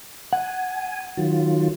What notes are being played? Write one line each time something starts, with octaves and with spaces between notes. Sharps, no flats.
F#5 G#5
D#3 F#3 F4